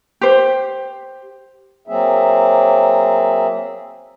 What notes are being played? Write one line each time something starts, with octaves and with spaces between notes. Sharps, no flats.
G4 C5
F#3 A#3 C4 G#4 E5